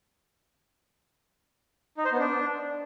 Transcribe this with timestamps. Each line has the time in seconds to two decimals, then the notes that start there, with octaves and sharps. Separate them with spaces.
1.98 D#4
2.05 C5
2.12 B3
2.20 D4